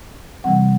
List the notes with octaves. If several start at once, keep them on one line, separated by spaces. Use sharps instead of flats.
C3 E3 G3 C4 F#5